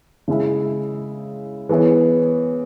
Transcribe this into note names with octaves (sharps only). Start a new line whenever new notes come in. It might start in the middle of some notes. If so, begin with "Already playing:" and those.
C#3 G#3 E4 G#4 E5
E3 B3 E4 G#4 C#5